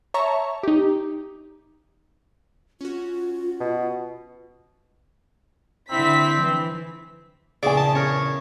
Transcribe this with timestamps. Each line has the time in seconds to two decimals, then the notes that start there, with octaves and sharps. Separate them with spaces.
0.14 C#5 E5 A5 A#5 C#6
0.63 D#4 G4
2.81 C#4 F4 F#4
3.60 B2
5.91 D3 C4 E4 B6
6.38 E3
7.63 A#1 E2 C#3 G#4 D5 G#5
7.77 A5
7.95 C#4 A#4 C#5